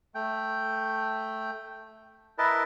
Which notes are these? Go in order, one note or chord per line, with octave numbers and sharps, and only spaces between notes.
A3 G5
E4 A#4 B4 D#5 A5